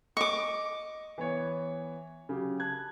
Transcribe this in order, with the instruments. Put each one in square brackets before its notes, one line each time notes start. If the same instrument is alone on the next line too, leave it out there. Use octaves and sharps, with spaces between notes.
[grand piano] D#5 [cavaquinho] C#6 D6
[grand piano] E3 B3 C#5
C#3 F#3 G4
A5 F#6 G#6